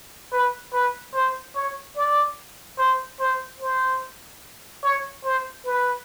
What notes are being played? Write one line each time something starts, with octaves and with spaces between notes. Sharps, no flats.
B4
B4
C5
C#5
D5
C5
C5
C5
C#5
C5
B4